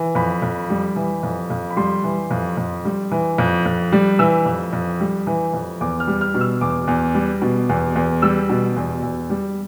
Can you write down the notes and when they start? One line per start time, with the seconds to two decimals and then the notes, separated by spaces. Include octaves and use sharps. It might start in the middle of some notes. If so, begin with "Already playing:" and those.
Already playing: E3
0.15 F2 B5
0.42 F2
0.70 G3
0.96 E3
1.23 F2
1.50 F2
1.71 B5
1.76 G3 C6
2.04 E3
2.31 F2
2.57 F2
2.85 G3
3.11 E3
3.38 F2
3.65 F2
3.92 G3
4.19 E3 E6
4.45 F2
4.73 F2
5.00 G3
5.27 E3
5.53 F2
5.81 E2 D6
6.00 F6
6.07 G3
6.21 F6
6.34 B2
6.41 E6
6.61 E2 D6
6.87 E2
7.15 G3
7.42 B2
7.69 E2
7.95 E2
8.22 G3 E6
8.49 B2
8.76 E2
9.03 E2
9.30 G3